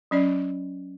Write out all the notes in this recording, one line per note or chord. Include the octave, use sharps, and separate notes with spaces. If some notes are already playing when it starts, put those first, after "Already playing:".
F#3 C#4 D5